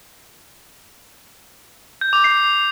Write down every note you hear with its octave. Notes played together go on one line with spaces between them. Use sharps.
G6
D6
C7